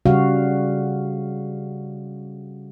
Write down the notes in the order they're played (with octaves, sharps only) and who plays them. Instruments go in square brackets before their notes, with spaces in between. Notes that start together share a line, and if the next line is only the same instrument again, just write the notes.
[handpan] C#3 G3 F#4 F5